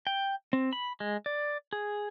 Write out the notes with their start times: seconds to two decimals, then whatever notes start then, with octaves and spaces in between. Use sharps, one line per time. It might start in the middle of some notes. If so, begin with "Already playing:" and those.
0.07 G5
0.53 C4
0.73 B5
1.00 G#3
1.26 D5
1.73 G#4